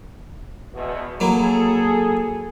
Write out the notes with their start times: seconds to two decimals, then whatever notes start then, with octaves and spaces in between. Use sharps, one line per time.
0.74 E2 B2
1.20 F#3 A#3 E4 G#4 A4